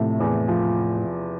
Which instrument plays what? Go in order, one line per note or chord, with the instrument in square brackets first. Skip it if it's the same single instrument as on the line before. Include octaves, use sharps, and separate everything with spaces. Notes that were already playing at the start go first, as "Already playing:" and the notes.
Already playing: [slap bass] A2 [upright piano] C3 F3 A3
[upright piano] E2
F3